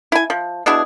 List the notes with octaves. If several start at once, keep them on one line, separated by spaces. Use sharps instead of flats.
E4 G#5
F3
B2 D4 E4 G#4